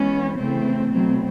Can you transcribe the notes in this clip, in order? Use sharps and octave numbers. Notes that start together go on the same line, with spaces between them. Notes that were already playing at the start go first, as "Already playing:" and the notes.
Already playing: E3 G#3 B3 C#4
C#3 E3 A3 C4
B2 F#3 A3 C4